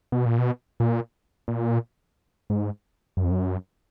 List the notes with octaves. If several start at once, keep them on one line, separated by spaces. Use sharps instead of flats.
B2
A#2
B2
A#2
A#2
G#2
F#2
F2
F#2